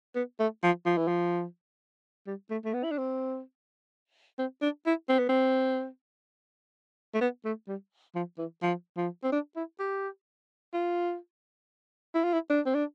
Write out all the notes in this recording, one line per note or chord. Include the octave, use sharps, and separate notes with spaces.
B3
A3
F3
F3
E3
F3
G3
A3
A3
B3
E4
D4
C4
C4
D4
E4
C4
B3
C4
A3
B3
A3
G3
F3
E3
F3
F3
C4
D4
E4
G4
F4
E4
F4
E4
D4
C4
D4